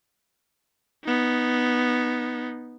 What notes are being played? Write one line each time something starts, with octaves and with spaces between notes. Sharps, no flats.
B3 D#4